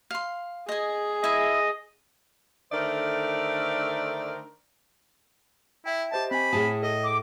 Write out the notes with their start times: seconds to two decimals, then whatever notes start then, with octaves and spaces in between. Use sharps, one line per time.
0.11 F5 C6
0.69 G#4 D#5 G#5
1.24 E4 D#5 E5
2.72 D3 D#3 A3 A#4 C5 D5
5.86 E4 E5 G5
6.12 G4 C5 D#5 A5
6.31 C4 G#5 B5
6.53 A2 G#4 A5 D#6
6.83 A4 D#5
7.05 D6